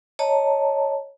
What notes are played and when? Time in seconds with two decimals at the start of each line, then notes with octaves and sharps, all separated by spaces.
0.19 C#5 D#5 A5 A#5